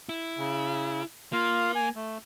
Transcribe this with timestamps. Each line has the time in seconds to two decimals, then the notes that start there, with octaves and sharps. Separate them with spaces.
0.09 E4
0.38 C#3
1.33 A#3 F4 F5
1.75 G#5
1.95 A3